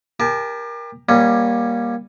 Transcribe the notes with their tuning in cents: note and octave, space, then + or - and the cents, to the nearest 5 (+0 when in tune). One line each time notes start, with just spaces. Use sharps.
G4 +30 A#4 +15 A5 -30
G3 +10 A#3 +20 C#4 -5